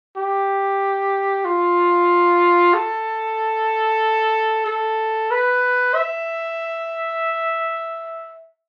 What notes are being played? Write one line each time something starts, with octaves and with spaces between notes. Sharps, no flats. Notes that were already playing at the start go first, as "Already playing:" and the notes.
G4
F4
A4
A4
B4
E5